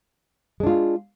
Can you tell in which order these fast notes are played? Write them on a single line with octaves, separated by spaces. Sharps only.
G#3 D4 F4